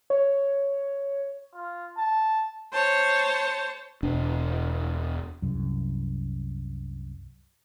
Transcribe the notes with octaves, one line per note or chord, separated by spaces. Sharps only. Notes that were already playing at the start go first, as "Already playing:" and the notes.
C#5
F4
A5
C5 C#5 A5
E1 D4
C2 F#2